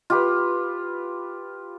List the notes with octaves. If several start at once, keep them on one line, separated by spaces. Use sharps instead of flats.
F4 G4 B4